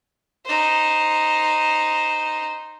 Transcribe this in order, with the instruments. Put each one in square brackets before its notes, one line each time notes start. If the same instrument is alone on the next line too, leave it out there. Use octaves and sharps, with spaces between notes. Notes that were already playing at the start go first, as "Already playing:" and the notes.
[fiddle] D#4 C5